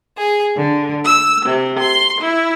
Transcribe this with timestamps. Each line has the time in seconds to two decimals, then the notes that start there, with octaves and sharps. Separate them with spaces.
0.17 G#4
0.57 D3
1.04 E6
1.45 C3
1.80 C6
2.21 E4